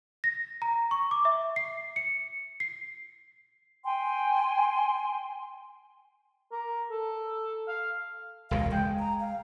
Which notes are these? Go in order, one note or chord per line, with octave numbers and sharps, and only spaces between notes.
A#6
A#5
C#6
D6
E5
C7
C#7
C7
G5 G#5 C6
A#4
A4
F5
E1 C#2 A#2 F5
G#3 G5
A#5
F5